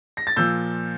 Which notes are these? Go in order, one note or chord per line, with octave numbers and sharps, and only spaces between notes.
A#6
A6
A#2 F3 E6 G6